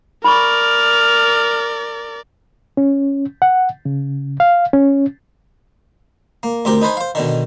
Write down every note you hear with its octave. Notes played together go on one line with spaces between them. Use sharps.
A#4 D5 B5 C#6 F6
C#4
F#5
C#3
F5
C#4
A#3
D2 C4 G4 A#4
D#4 B4 C5 G#5
C5 F5
B2 D3 D#3